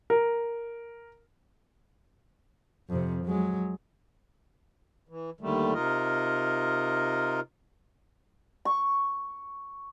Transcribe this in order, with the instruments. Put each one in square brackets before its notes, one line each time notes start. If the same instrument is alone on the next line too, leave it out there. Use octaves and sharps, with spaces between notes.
[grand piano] A#4
[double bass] F2 C3
F#3 G#3
[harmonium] E3
D#2 D3 D#3 G3 A3
C3 D#4 F4 A#4 D#5
[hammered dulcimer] C#6